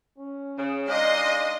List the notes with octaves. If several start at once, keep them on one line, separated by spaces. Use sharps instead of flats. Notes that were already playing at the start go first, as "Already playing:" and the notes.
C#4
C#3
G#3 D4 D#4 D#5 F5 C6